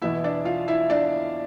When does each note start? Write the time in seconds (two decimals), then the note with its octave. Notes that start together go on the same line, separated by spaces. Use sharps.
0.02 E2 B2 B3 E4 E5
0.24 D4 D5
0.45 F4 F5
0.68 E4 E5
0.90 D4 D5